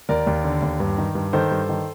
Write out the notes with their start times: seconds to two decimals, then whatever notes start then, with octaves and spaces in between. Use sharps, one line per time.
0.09 D#2 A#4 D5
0.27 D#2
0.44 D3
0.62 D#2
0.80 G2
0.98 D#3
1.15 G2
1.33 D#3 A4 C5
1.51 G2
1.69 D#3